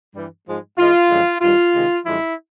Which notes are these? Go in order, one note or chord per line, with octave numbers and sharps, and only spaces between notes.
G2 E3 G3
G#2 F3 G#3
G#2 E3 G#3 F4
F#2 D3 F3 G#3
G2 D#3 G3 F4
C3 D#3 G#3
F#2 D3 F3 G#3 E4